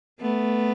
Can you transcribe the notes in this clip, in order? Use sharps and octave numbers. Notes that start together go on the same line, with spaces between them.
A3 B3